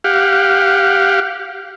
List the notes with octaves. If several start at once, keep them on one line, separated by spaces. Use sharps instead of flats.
G4 F5 F#5